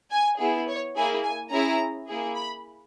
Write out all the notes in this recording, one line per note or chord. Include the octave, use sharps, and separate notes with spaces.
G#5
B3 E4 G#4
C#5
A#3 E4 G#4 G#5
G#5
C#4 E4 G#4 A#5
A#3 E4 G#4
B5